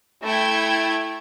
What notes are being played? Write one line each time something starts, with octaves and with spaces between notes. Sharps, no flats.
A3 E4 G5 G#6